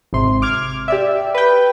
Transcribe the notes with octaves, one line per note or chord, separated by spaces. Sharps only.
G#1 C3 C6
D6 F6 G#6
G4 D5 E5
B4 G5